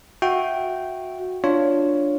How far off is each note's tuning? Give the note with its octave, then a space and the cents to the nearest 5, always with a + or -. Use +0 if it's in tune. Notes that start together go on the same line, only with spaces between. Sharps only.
F#4 -15 E5 +0 G5 -10
D4 +0 F4 +0 C#5 +0